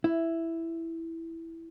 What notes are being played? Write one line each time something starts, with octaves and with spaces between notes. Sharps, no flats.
E4